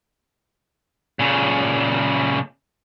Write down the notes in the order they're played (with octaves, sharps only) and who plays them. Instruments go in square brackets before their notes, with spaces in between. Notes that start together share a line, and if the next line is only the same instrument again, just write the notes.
[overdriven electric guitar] A#2 C#3